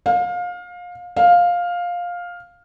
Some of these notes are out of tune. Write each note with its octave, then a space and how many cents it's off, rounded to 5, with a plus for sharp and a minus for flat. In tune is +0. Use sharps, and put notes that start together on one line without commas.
F5 +25
F5 +10